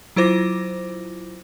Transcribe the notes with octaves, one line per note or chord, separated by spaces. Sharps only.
F#3 E4 F4 C5 D6 A#6